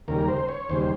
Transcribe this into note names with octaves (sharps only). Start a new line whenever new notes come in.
D#2 C#3 G3 A#4
C5
C#5
D#2 C#3 G3 C5